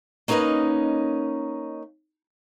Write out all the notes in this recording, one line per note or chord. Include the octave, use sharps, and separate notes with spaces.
A#3 C#4 D#4 A#4 B4 D#5